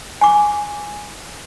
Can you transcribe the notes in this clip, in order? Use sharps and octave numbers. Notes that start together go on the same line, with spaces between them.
G#5 D6